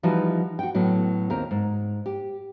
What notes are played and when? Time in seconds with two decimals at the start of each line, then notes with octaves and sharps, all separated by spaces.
0.03 E3 F3 G3 D#4 F#4
0.59 F#4 G5
0.75 A2 F#3 B3
1.30 D#2 C4 A#4
1.51 G#2
2.06 G4